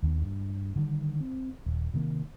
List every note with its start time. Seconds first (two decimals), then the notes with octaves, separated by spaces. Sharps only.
0.03 D#2 D#3 A#3 B3
0.22 G2
0.76 D3 D#3 G3
1.21 C4
1.66 D#1
1.94 C3 D#3 A3 A#3